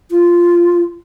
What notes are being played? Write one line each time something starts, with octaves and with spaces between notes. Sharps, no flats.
F4